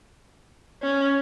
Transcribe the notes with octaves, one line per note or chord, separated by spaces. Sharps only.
C#4